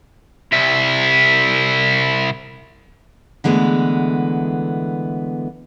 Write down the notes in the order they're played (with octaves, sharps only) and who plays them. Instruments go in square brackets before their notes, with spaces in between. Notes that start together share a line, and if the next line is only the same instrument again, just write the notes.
[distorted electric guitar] C2 E4
[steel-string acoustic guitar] D3 E3 G#3 A3 B3